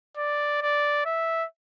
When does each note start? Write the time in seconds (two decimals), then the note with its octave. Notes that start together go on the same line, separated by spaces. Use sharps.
0.17 D5
0.61 D5
1.05 E5